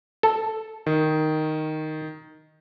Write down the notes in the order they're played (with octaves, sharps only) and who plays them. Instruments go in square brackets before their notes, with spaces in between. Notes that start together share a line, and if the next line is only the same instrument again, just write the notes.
[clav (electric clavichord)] A4
[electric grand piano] D#3